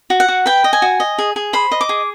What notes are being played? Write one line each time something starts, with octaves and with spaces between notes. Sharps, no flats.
F#4
F#5
F#4
B4 G5
D#5
G#5
F#4
D#5
G#4
G#4
C5 B5
D#5
D6
G#4